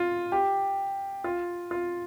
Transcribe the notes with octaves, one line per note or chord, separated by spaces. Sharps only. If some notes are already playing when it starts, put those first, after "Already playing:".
Already playing: F4
G4
F4
F4